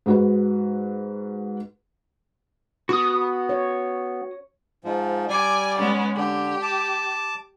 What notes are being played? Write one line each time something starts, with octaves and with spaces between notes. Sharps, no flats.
G#2 F#4 B4
B3 F#4 D#6
C#5
G#2 F3
G3 D5 G#5 D6
G#3 B3 C#4
D3 G4
A5 D6